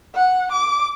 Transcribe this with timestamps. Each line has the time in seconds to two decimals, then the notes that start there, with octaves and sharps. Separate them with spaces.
0.15 F#5
0.52 D6